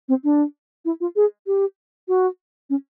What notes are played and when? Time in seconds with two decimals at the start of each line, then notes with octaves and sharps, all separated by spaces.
0.08 C4
0.24 D4
0.85 E4
1.00 F4
1.16 G#4
1.47 G4
2.08 F#4
2.70 C#4